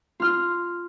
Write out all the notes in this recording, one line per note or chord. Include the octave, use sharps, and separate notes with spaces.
F4 F6